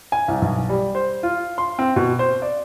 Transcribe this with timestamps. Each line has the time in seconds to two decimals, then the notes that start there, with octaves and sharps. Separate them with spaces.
0.12 G#5
0.28 C2
0.42 B1
0.69 G3
0.95 C5
1.23 F4
1.58 C6
1.79 C4
1.96 B2
2.19 C5
2.42 D5